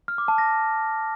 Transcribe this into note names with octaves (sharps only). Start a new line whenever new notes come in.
F6
D6
A5
A#6